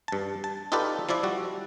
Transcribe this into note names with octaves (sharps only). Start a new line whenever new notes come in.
G2 A5
A5
D#4 F4 G4 A4 B4 D5
F3 E4 D5 E5
G3 F#4